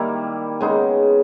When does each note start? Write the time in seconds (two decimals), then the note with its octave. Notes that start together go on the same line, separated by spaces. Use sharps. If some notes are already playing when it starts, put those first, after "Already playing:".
Already playing: D#3 G3 A#3 E4
0.61 C#3 G#3 B3 D#4